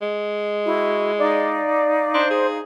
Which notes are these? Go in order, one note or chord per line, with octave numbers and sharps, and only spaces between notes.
G#3
E4 F#4
D#4 D5 F5
D4 C5
G#4